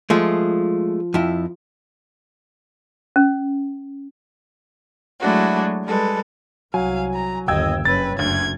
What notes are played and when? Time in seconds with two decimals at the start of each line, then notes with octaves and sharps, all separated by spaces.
0.10 F3 G#3 A3
1.14 F2 E4
3.16 C#4
5.20 F#3 G#3 A3 D4 E4 F#4
5.84 G3 G#3 A4 B4
6.74 C2 F#3 F5 G#5
7.14 A#5
7.48 G1 D#2 D#5 G5 E6 G#6
7.85 F#1 G2 C#4 B4 A6
8.19 F#1 D2 G#6